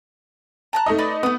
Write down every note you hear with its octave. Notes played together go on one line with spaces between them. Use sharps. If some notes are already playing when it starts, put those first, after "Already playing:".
A5 A#5 F#6
A3 D#4 D#5
B4 D5
A3 B3 D#6